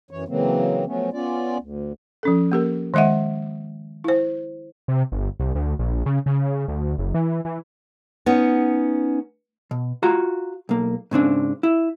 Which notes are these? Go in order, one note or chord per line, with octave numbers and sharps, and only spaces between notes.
F#2 E3 C#5
C#3 E3 F#3 A#3 C4
F3 F#3 A3 B3 C#4
B3 C#4 F4 D5
D2
F3 C#4 A4
A#3 G4 A#4
D#3 G#3 D#5 E5 F#5
E4 C5
C3
G1
C2
D2
A#1
C#3
C#3
D2
F#1
E3
E3
B3 C#4 D#4
B2
F4 F#4 A#5
B1 A#3
G#2 C#3 C4 D4
E4